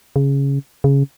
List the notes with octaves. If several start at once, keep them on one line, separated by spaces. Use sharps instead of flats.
C#3
C#3